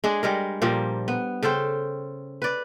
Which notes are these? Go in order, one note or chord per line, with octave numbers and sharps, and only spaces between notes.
G#3 D4 G#4
G3 G#3 A#4
A#2 F3 G3 A#3
B3
C#3 A4 C5 G5
B4 D5